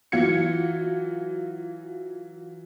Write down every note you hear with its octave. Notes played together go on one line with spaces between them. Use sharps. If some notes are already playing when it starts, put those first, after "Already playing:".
E3 F#3 F4 G#6 C#7